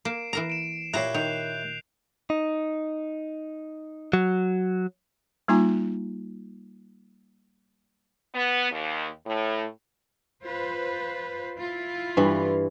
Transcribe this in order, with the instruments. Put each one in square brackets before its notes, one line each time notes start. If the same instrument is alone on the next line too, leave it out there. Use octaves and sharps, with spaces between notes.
[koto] A#3 [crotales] C7 D7 E7
[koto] E3 A#4 A#5
[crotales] D7 E7
[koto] A#2 A#5 [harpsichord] E4 G4 C#5 [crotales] F#6 C7
[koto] D#3 [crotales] G6 F7
[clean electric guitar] D#4
F#3
[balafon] G3 A#3 D#4 F4 G#5 A#5
[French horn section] B3
D#2
A2
[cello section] F4 B4 C5
E4 F4
[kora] G2 E3